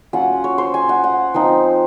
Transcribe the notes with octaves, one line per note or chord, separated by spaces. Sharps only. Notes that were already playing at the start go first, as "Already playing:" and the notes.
F#3 C#4 F4 F#5
C#5
C5
G#5
F#5
F#5
F3 C4 D#4